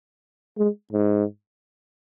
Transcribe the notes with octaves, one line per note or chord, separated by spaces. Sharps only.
G#3
G#2